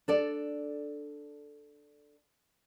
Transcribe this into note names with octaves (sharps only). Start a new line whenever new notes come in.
D4 A4 D5